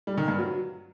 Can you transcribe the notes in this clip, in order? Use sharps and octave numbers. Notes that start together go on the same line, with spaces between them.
G3
D#3
G2
F#3